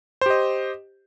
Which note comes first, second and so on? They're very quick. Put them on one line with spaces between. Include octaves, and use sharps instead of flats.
C5 G4 D#5